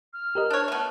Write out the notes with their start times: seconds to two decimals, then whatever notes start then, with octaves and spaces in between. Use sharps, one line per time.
0.13 F6
0.35 G4 A#4 D#5
0.50 D4 C#5
0.68 A3 B3